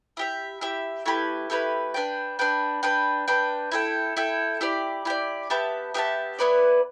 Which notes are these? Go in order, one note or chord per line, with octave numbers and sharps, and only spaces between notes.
E4 G4 E5
E4 G4 E5
A3 E4 G4 B4
A3 E4 G4 B4
D4 B4 G5
D4 B4 G5
D4 B4 G5
D4 B4 G5
E4 A4 G5
E4 A4 G5
E4 G4 D5
E4 G4 D5
B3 G4 E5 A5
B3 G4 E5 A5
B3 E4 B4 D5